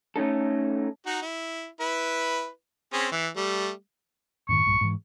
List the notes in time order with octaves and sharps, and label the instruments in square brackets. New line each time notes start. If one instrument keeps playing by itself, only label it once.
[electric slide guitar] A3 C#4 D#4 A4
[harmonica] D#4 F#4
E4
E4 B4
C4 C#4 G#4
E3
G3 A3
[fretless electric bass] F#2 A2 D#3 [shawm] C#6
[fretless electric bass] A#1 G2
G#2 E3